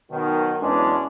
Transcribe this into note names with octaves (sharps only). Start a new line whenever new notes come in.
B2 D#3 F#3
E2 E3 F#3 G#3 C#4 D4